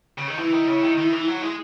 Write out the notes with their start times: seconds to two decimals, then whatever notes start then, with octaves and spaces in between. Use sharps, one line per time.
0.18 C#3
0.28 D#3
0.38 E3 E4
0.53 D#3
0.68 C#3
0.83 D#3
0.98 D#3
1.12 E3
1.27 F#3
1.42 G#3